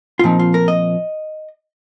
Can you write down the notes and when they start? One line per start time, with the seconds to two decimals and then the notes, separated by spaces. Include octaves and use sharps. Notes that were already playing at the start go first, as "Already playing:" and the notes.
0.19 F4
0.24 A#2 F3 C4 D#4
0.39 F4
0.54 A#4
0.68 D#5